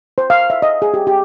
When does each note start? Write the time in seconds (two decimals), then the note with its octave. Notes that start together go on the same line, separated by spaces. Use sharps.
0.18 C5
0.30 F5
0.50 E5
0.62 D#5
0.82 G#4
0.94 G4
1.07 G4